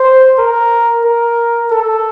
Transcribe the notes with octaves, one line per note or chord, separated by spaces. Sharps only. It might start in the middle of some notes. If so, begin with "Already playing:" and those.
Already playing: C5
A#4
A#4
A4